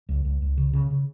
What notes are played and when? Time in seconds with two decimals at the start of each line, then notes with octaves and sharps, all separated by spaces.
0.09 C#2
0.25 C#2
0.42 C#2
0.58 C#3
0.73 C#3
0.91 C#3